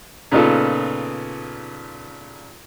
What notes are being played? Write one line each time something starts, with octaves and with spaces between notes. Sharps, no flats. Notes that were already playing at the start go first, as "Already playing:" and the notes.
A#2 C#3 B3 D#4 F4 A4